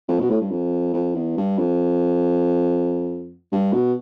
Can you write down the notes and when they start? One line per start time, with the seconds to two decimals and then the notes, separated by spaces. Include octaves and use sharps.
0.08 F2
0.20 B2
0.30 A2
0.41 G2
0.51 F2
0.94 F2
1.15 E2
1.37 G2
1.59 F2
3.52 G2
3.73 B2